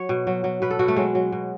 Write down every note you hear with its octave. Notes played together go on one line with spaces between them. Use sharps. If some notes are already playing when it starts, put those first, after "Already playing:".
Already playing: F#3 C#5
B2
F#3
F#3
B2 B4
A4
B2 F#4
A3
F#3 G#3
F#3
B2